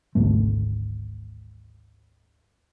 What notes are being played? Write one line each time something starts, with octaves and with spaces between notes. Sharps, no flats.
G#1 D2 A3